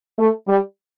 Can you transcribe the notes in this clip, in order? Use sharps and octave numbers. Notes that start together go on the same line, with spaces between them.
A3
G3